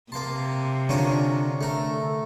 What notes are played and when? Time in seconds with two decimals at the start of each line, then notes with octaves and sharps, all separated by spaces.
0.12 C3 A#3 A5 C6
0.89 D3 C#4 D4 F4 A#4
1.61 A3 A4 A#4